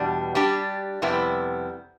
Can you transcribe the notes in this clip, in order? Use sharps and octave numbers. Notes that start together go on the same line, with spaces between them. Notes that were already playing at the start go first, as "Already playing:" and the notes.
Already playing: E2 B2 G3 D4
G3 D4 G4
F2 C3 G3 B3 E4